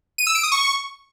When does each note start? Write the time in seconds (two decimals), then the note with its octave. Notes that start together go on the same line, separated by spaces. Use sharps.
0.18 D#7
0.27 E6
0.35 D7
0.43 D#6
0.52 C#6